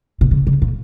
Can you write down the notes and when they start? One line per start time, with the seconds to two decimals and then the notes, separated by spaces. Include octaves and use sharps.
0.21 B2
0.31 C#3
0.47 C#3
0.62 A#2